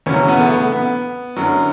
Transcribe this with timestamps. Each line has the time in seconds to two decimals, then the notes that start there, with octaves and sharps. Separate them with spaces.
0.06 E2 C#3 F#3 C#4
0.28 B3
0.40 A3
0.50 B3
0.72 B3
1.36 F#2 D3 F#3